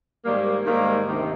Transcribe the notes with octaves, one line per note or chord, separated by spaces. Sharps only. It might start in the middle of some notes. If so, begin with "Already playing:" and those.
G#2 D#3 G3 A#3
G#2 D#3 G3 A#3
D2 C3 D#3